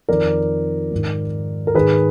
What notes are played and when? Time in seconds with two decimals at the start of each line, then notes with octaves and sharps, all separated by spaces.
0.08 F2 D#3 A#4 D5
0.92 G#2 D#3
1.67 A#4
1.74 G#2 D#3 G#4 B4